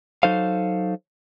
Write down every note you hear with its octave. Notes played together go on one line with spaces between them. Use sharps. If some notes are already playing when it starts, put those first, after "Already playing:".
F#3 D#4 A4 C5 F5